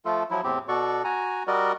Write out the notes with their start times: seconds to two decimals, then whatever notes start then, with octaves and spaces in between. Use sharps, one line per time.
0.05 F3 A3 F4 A4
0.31 F3 F#3 E4
0.44 E2 A2 C4 G4
0.68 B2 F#4 A4 D5 C#6
1.04 F#4 G#5 A#5
1.47 G3 F#4 A#4 D5 D#5